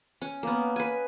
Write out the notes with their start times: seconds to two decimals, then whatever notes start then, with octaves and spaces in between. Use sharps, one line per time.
0.21 C#4
0.43 A#3 B3
0.76 B4 G#5